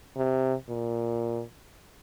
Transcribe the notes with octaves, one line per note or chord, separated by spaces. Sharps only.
C3
A#2